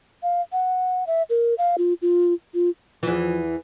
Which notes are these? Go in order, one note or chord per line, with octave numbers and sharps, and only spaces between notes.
F5
F#5
E5
A#4
F5
F4
F4
F4
E2 E3 F3